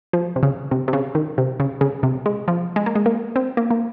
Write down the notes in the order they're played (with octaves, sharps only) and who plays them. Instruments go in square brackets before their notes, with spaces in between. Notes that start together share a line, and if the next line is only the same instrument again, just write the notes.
[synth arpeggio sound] F3
C3
C#3
C3
C3
C#3
D#3
C3
C#3
C#3
C3
G#3
F3
G#3
A#3
G#3
A#3
C4
A#3
A#3